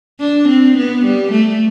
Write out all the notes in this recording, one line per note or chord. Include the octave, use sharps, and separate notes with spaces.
D4
C4
B3
G3
A3